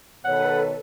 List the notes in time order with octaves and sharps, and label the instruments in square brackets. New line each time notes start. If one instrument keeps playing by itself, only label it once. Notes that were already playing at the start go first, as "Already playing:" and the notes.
[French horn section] B2 D#3 C#5 [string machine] A4 B4 [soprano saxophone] F#5